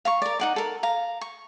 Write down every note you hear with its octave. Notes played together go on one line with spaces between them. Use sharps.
F5 A#5 C#6
A#4 D5
D#4 F#5 D6
A4 A#4
F5 A#5
C#6